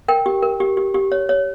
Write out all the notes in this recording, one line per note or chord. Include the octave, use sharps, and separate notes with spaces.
A#4 G5
G4
A#4
G4
G4
G4
C#5
C#5